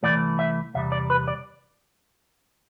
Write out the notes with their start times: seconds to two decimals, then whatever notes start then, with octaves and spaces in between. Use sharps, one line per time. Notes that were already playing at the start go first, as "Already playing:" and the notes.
0.03 C2 C3 E3 A3 D5
0.39 E5
0.74 E2 C3 G3 E5
0.92 D5
1.10 B4
1.28 D5